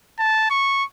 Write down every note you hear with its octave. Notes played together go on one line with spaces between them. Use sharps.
A5
C#6